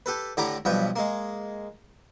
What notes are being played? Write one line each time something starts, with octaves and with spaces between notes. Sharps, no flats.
G4 A4 B4
A2 D3 G4 A#5 B5 D6
B1 G2 F3 B4 G5
G#3 A#3